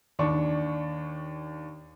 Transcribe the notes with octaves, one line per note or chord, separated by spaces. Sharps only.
D#2 D4 C#6